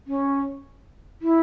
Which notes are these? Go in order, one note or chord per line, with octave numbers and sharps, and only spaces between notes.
C#4
E4